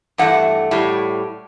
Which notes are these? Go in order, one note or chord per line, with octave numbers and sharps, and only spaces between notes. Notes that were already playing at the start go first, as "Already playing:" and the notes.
G2 E3 A3 F#5
A2 G3